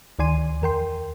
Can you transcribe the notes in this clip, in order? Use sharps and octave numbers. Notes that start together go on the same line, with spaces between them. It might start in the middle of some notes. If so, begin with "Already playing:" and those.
D2 D#3 D5 G#5 C6 D#7
E2 A#4 G5 C6